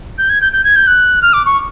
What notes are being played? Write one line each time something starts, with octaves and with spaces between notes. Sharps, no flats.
G6
G#6
G6
G6
G#6
G6
F#6
F6
D6
C#6